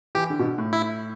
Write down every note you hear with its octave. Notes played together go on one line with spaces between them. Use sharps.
E3 G4
D3
B2
D3
A2
E4